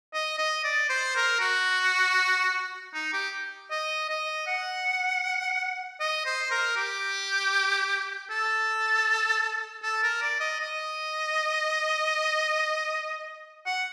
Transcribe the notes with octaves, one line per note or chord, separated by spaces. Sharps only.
D#5
D#5
D5
C5
A#4
F#4
D#4
G4
D#5
D#5
F#5
D#5
C5
A#4
G4
A4
A4
A#4
D5
D#5
D#5
F#5